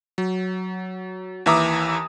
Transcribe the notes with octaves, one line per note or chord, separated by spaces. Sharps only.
F#3
D#2 E3 E5 A#5 D6 D#6